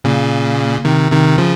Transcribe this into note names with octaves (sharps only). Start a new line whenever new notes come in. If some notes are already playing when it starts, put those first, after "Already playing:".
A#2 C#3
C3 D#3
C3 D#3
C#3 F3